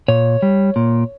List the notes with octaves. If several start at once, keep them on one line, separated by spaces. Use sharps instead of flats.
A#2 C#5
G3
A#2